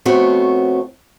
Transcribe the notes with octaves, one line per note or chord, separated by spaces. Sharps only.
F2 A3 B3 C4 F#4 C#5